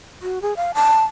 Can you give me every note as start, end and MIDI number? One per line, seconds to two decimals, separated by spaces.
0.22 0.42 66
0.42 0.54 68
0.57 0.71 77
0.75 1.03 81